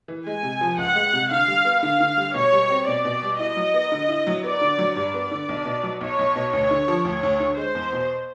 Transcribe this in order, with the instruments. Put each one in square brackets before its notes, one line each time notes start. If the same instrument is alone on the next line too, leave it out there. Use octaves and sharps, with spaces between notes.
[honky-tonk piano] E3
[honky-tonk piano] G#3 [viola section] G#5
[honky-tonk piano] C3
F3
[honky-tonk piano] C#2 [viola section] F#5
[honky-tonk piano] G#3
C3
[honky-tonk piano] D3 [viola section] F5
[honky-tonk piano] G3
B3
[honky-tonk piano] D3 [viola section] F5
[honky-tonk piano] D3
G3
[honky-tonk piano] B2 [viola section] C#5
[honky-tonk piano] G3
C4
[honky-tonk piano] B2 [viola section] D5
[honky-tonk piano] B2
G3
[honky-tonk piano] E4 [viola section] D#5
[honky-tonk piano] F#3
B3
D3
E4
F#3
[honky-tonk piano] B3 [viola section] D5
[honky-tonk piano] D3
F#3
[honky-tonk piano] G2 [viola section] D5
[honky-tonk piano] B3
D3
B1
B2
F#3
[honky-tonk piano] B1 [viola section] C#5
[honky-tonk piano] B1
B2
[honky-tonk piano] D2 [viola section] C#5
[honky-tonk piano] D3
F3
[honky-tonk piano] D2 [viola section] C#5
[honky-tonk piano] D2
D3
[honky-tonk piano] G#3 [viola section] C5
[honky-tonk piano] E2
B2